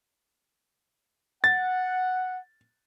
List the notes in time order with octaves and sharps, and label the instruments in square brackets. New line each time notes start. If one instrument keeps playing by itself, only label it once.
[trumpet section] F#5 [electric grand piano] A6